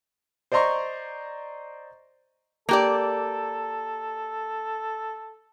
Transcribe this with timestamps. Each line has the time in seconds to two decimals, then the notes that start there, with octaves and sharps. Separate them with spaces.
0.52 C5 D5 D#5 A#5 C6 C#6
2.69 A#3 G4 A4 D5